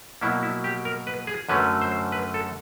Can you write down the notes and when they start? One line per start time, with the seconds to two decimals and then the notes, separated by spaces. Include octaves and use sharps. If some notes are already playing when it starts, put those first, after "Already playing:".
0.21 B2 F#3 A#3 E4
0.43 E4
0.64 G4
0.85 A#4
1.07 B4
1.27 G#4
1.49 F#2 D3 F#3 A3 C#4 B4
1.82 C5
2.12 B4
2.34 A4